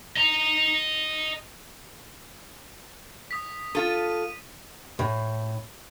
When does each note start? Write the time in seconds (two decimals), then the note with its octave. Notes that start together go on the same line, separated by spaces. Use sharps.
0.16 D#5 A#5
3.31 D#6 B6
3.75 F4 A4 D#7
4.99 A2